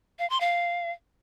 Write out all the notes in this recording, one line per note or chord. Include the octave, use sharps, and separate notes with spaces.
F5
C6
F5